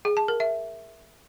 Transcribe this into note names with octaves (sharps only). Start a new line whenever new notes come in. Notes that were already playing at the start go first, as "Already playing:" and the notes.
G#4
A5
A#4
E5